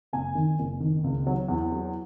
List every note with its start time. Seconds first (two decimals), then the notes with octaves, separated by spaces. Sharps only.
0.13 F#1 G#5
0.35 D#3
0.59 F#1
0.80 D#3
1.04 C#2
1.27 F#3
1.48 E2
1.72 F#3